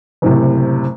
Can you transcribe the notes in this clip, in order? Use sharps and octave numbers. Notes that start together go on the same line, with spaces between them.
F#1 A2 C3